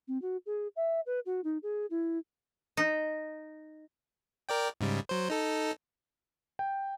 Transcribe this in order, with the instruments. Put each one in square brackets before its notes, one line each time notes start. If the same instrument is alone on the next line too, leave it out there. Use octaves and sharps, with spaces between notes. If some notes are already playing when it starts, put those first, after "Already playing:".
[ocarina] C4
F#4
G#4
E5
B4
F#4
D#4
G#4
E4
[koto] D#4
[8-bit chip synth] A#4 D5 G5
G#2 C#3 G3
F#3 C5
D#4 A4
[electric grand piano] G5